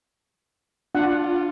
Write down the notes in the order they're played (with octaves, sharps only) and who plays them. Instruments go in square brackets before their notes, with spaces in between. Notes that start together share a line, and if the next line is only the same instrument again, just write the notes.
[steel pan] D4 F#5 [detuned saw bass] F4